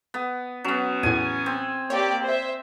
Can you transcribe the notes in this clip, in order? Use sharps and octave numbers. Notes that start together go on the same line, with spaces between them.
B3
F#3 B3 C#4
E2 A2 G#5
C4
A#3 G4 C#5 D5
C5 E5